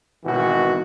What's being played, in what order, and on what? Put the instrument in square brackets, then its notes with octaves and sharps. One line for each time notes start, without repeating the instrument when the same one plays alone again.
[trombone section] G#1 B2 E3 F#4